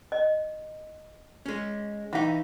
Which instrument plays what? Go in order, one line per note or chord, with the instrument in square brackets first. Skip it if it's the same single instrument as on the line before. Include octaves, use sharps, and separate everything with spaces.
[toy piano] D#5
[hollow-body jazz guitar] G#3 C#4
[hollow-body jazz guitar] E3 D#4 [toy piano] E5 F5